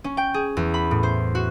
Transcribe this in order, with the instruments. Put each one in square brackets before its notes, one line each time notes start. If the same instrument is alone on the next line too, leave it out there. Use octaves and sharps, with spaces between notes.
[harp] C#4
G5
G#4
E2
B5
A2
C5
F#4